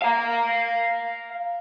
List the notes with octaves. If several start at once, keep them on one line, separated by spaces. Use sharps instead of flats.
F5 A#5